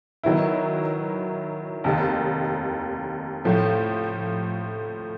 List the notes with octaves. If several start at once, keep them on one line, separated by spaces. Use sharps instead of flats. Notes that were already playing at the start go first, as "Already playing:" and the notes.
D#3 F#3 B3 E4
F1 D#2 D#3
A2 F3 A3